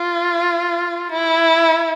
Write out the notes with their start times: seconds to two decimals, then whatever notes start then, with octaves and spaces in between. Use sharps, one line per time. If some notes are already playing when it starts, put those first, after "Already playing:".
Already playing: F4
1.12 E4